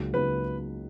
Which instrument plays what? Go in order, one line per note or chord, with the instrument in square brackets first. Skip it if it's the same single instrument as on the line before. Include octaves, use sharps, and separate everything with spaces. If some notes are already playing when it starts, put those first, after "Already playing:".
Already playing: [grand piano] C#2 C#3 F#3 A#3 D#4
[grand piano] C#2 C#3 F#3 A#3 D#4 [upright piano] B4